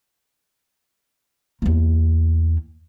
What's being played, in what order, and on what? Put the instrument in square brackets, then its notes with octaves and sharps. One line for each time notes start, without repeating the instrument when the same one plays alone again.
[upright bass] E2 A#3